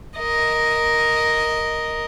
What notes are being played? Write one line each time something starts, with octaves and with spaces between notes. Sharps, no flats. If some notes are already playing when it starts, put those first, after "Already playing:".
A#4 D#5